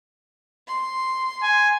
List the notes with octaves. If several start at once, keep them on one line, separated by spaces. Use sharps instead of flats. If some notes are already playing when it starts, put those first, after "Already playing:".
C6
G#5